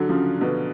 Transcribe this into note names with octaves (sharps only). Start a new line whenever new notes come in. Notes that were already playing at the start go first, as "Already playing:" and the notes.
Already playing: D3 F#3
C#3 F3
B2 D3